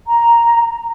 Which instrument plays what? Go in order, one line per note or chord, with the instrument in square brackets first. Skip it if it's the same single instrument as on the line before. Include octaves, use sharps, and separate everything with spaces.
[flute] A#5